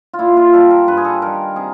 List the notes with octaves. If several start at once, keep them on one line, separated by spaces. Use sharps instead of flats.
F4
A#2 E4
F4
G3 A4
A#4
G2 B4
G#4
A4
D#3 G3 A#4
C3 G#4